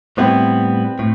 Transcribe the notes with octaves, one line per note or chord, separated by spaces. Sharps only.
A2 G3 B3 C4 E4
A2